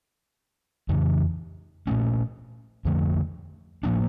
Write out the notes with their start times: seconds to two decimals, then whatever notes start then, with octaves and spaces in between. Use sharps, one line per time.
0.89 F2 C#3 E3
1.87 A#2 A3 C#4
2.85 F2 D3 F3 A3
3.83 A2 F3 A#3 D4